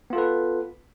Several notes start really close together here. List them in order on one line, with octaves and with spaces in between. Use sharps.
B3 F4 A4 B4